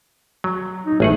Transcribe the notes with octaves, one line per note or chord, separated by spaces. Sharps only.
F#3
D#4
A1 A3 G#4 F#5